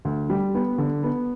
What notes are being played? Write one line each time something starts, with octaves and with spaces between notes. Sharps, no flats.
D2
G3
B3
D3
B3